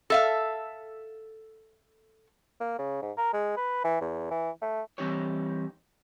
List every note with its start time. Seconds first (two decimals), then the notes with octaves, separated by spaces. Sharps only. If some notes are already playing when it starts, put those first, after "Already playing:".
0.10 A4 E5 F5
2.60 A#3
2.78 C#3
3.02 G#2
3.17 A#4
3.33 G#3
3.56 B4
3.84 E3
4.01 E2
4.31 E3
4.62 A3
4.98 E3 G3 C4 D#4 G4 C#5